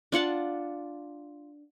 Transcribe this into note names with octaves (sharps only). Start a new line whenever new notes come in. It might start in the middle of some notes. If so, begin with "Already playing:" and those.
D4 F4 F#5 A5